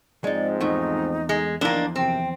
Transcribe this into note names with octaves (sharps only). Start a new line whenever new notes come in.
G#2 F3 G#3 C4 D#4 D5
E2 A3 D#4
G#3
E2 D#3 F3 A#3 D4 E4
F#2 C3 C4 G5